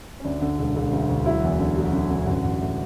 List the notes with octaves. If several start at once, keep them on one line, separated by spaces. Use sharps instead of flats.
C#4
D2 D4
D3
E1
E1
D2
D2
F#3 E4
E2
D3
F#3
D3
D3
A1 F#4
A1
A2